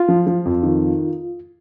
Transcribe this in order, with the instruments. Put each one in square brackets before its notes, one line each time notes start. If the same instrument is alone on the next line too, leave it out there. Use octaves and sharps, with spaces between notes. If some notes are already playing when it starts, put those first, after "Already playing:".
Already playing: [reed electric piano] F4
[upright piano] F3
F3
F2
D#3